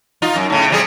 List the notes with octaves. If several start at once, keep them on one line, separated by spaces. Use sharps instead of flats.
D#4 F4
F#2
A2 C#3
C3 G3 G#4